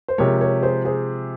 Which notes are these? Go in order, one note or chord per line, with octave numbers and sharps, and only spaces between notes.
C5
C3 F3 G#3 A#4 C#5
A#4 C#5
G#4 C5
G#4 C5